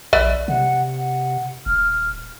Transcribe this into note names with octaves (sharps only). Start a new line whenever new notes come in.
A#1 B4 D5 E5
C3 F#5
F#5
D#1 F6